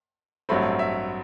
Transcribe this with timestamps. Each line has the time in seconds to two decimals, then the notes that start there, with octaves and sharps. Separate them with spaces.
0.49 A1 G2 F#3 A3 C4 B5
0.79 E5